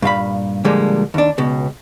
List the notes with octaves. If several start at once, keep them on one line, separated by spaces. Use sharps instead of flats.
G2 A#2 F5 B5
A#2 D3 F3 G3 G#3 A#3
D#2 D4
C#2 B2